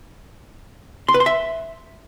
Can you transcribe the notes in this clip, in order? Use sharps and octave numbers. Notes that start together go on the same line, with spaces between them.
C6
B4
C6
E5